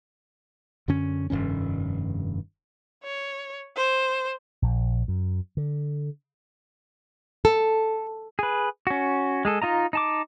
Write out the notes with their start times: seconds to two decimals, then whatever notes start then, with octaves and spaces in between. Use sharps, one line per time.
0.88 F#2 D3 C#4
1.30 F1 G2 D#3 C#4
3.04 C#5
3.77 C5
4.62 A#1
5.08 F#2
5.57 D3
7.45 A4
8.39 G#4 B4
8.87 C#4 F#4
9.45 G#3 G#4 A4
9.62 D#4 F4 D#5 A#5
9.93 D#4 A5 D6